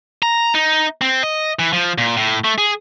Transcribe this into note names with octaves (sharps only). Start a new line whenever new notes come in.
A#5
D#4
C4
D#5
E3
F3
A#2
A2
A3
G#4